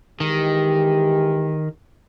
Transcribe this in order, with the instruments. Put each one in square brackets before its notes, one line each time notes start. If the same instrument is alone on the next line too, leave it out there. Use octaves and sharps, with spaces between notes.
[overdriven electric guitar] D#3 [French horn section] E3 G#3 G4